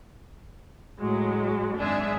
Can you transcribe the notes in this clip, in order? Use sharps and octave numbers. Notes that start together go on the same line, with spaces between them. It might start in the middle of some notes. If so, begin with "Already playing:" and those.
A2 F#3 G#3
G#1 F#2 G#3 D4 G#4 E5